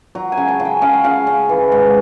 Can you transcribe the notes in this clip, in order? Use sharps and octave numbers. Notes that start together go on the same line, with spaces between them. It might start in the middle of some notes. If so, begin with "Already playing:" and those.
F#3 A#5
G#5
C#3
A5
C#3
G5
C#3 F5
F#5
C#3 F5
C#3
E3
G#2